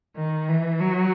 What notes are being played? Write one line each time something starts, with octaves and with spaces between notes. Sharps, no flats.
D#3
E3
F#3